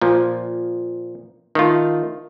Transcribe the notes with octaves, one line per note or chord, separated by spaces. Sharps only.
A#2 F3
D#3 A3 F4